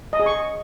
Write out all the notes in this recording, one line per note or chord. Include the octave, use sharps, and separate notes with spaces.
D#5
G#4
C#6